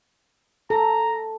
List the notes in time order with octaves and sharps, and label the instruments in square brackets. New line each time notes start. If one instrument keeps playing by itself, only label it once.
[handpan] A4 [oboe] A#5